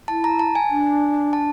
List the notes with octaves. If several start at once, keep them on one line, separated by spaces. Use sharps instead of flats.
E4 A5
A#5
A5
G#5
D4
A5